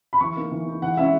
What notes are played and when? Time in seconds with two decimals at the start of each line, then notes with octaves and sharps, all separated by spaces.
0.13 B5
0.21 E3 C#6
0.36 A#3 D#4
0.51 E3
0.66 A#3 D#4
0.82 E3 F#5
0.97 G#3 C#4 E4 E5